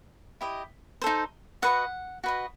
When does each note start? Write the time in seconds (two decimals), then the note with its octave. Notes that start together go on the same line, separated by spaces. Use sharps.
0.41 E4 G4 D#5
1.02 D#4 A4 C5
1.62 F#4 B4 D#5 F#5
2.24 F#4 B4 D#5